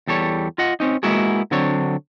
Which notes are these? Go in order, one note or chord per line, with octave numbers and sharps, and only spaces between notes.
E2 G3 A4 C#5
F4 D#5 F#5
C4 C#4 D#4
G#3 A#3 B3 E4 F#4 G#4
D3 F#3 C4 D4 C#5